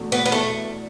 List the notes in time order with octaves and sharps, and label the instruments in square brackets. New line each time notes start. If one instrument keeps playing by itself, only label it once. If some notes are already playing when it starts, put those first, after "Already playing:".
Already playing: [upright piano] E2 B2 A3 D4 F#4
[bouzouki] B3
B3
A3